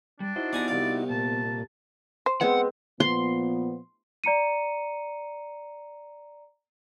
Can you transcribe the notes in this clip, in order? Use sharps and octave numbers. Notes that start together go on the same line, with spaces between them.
G3 D4
D#4 E4 F#4 C5
B3 C4 G4 D5 G#5 A#5
C2 D5 F5
A#2 A5
C5
G#3 B3 C4 F#5
A#2 F3 B3 C6
D5 A#5 C#7 D#7